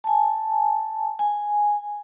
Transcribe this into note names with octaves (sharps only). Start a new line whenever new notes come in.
G#5 A5
G#5